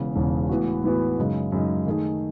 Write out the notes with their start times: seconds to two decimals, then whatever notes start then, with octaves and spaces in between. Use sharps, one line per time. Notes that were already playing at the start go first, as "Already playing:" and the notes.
Already playing: E1 E2 C#3
0.16 E1 E2 C#3
0.49 A2 E3 B3 F#4
0.84 A2 E3 B3 F#4
1.19 F#2 C#3 G#3 D#4
1.52 F#2 C#3 G#3 D#4
1.86 D#3 A3 D#4 G#4